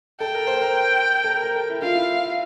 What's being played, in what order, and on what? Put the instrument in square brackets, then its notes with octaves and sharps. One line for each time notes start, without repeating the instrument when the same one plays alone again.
[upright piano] A4 [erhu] G5
[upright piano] A#4
C5
A#4
A4
A#4
A#4
A4
E4
[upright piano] F4 [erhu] F5
[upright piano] E4